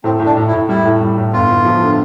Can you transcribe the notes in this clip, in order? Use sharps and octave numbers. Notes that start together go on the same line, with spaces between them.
A2 C4
A2
D4
A2
E4
A2
G3 E4
A2
G3
A2
G1 F4
G1
F3
D3